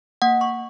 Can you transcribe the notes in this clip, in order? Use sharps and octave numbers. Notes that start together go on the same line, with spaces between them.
A#3 F#5
C#6